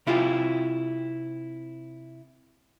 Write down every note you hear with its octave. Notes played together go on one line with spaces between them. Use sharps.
C3 E4 F4 G4